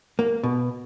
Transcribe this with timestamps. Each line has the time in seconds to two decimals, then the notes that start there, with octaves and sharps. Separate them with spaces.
0.19 A#3
0.44 B2